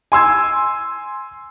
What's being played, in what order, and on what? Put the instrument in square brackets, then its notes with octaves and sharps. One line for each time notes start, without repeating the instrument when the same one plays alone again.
[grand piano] G#5 C6 E6 G#6